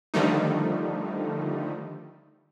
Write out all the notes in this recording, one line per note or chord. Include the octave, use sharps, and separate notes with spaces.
D3 D#3 F3 G3 A3 D#4